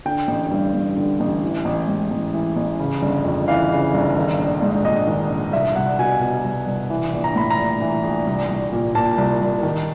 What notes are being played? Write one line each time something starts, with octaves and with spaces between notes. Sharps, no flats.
D3 G5
A1
G2
A1
D3
A1
E3
A1
G#2
A1
E3
A1
C#3
G1
F2
E3 F5
C#3
G1
D#3
A#1
G#2
A#1 D#5
D#3
A#1
C2 E5
C2 F#5
B2 G#5
B2
C2
C2
E3
A#1
A#5
A2 B5
A#5
A#1
E3
A#1
C2
C2
A#2
A#2 A5
C2
C2
D#3